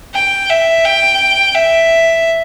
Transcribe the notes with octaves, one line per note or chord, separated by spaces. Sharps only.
G5
E5
G5
E5